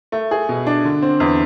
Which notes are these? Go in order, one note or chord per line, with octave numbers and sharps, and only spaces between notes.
A3
G#4
B2
D4
D3
C4
E2